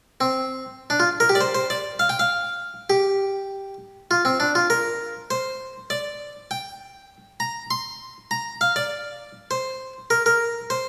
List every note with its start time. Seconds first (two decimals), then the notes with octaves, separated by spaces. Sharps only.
0.21 C4
0.90 D4
1.00 F4
1.20 A#4
1.29 G4
1.35 D5
1.41 C5
1.55 C5
1.70 D5
1.99 F5
2.09 G5
2.19 F5
2.90 G4
4.11 F4
4.25 C4
4.40 D4
4.55 F4
4.70 A#4
5.31 C5
5.90 D5
6.51 G5
7.40 A#5
7.71 C6
8.31 A#5
8.61 F5
8.76 D5
9.51 C5
10.10 A#4
10.26 A#4
10.70 C5